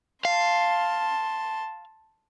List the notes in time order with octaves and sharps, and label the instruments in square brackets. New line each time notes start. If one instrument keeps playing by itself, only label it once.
[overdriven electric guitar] F5 [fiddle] A5 C6